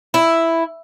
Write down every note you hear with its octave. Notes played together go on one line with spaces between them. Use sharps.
E4